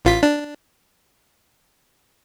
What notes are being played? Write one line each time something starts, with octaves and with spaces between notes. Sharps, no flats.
A1 F4 B6
D4